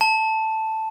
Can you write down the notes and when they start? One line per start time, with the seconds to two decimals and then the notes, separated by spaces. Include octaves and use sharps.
0.01 A5